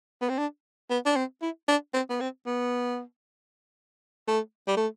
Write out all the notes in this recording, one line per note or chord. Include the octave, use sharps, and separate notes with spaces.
B3
C4
D4
B3
D4
C4
E4
D4
C4
B3
C4
B3
A3
G3
A3